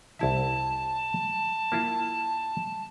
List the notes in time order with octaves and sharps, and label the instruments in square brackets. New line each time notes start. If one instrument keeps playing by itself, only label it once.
[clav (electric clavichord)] C2 E4 E5 [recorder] A5
[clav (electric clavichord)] A#3 E4 F4